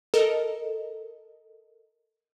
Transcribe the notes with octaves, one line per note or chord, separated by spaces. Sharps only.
A4 A#4 D#5